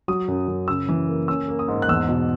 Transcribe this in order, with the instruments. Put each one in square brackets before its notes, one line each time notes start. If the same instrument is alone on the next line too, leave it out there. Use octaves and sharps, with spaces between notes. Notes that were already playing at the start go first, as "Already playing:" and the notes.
[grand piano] F#3 D#6
F#2
F#2
C#3 E6
E3
A#3
C#4 E6
A#3
D#6
G#2
F#6
E2 E6
B2